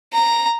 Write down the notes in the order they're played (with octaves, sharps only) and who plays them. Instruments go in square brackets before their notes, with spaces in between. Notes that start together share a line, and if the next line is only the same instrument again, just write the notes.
[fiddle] A#5